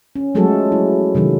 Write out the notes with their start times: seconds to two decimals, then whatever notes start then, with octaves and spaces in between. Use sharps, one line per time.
0.16 C#4
0.35 F3 F#3 G#3 A3 F#4 A4
0.72 E4
1.15 C3 D#3 F#3 G#3